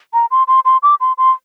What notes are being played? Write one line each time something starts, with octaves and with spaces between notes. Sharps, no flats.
A#5
C6
C6
C6
D6
C6
C6